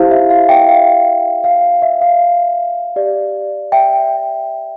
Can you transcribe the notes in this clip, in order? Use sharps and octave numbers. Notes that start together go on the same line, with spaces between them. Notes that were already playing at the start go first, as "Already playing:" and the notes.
Already playing: E4 G4 C5 F5
E5
F5
E5 G5
F5
F5
E5
F5
G4 D5
E5 G5